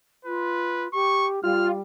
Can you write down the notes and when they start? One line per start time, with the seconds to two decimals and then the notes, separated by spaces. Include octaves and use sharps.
0.25 F4 B4
0.93 G4 C#6
1.44 G3 F4 F6